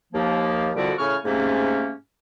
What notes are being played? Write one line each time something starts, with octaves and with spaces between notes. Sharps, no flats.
D#2 F3 A#3
C2 F2 D3 G3 F#4 D5
A2 C#3 G#5 C#6 F6
G#2 C3 A3 A#3 C#4